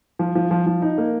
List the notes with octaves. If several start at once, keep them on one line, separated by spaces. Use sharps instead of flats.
F3
F3
F3
F3
D#4
A#3